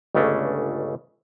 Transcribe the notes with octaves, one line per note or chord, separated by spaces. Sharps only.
G1 C#2 C#3 A3 C#4 D4